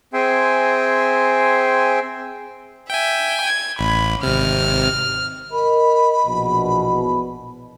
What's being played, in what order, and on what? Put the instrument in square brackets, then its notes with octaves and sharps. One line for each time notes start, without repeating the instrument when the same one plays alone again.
[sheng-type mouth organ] C4 G#4 E5 G5 G#5 C6
[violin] E5 [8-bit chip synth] G5 G#5
[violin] G#6
[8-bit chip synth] A1 [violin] B5
[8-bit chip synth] G#1 C3 [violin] F6
[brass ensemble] A#4 D#5 [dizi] B5
[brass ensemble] A#1 E2 B2